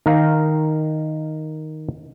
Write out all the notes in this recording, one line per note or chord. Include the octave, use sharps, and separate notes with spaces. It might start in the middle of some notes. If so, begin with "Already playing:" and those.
D#3 A#4 F5